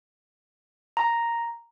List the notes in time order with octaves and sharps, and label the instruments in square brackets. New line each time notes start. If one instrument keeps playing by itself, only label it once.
[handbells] A#5